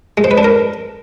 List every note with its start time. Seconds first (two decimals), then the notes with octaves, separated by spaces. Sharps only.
0.17 G#3
0.24 C5
0.31 B4
0.38 D4
0.44 A#4